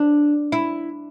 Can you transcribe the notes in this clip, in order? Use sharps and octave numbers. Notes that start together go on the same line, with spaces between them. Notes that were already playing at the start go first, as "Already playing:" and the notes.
Already playing: D4
E4